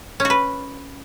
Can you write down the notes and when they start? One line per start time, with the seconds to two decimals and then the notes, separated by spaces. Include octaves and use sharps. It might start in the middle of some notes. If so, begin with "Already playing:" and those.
0.20 C#4
0.25 F#4
0.30 B4